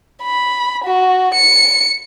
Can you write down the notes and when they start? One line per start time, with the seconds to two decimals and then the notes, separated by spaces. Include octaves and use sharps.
0.23 B5
0.84 F#4
1.34 C#7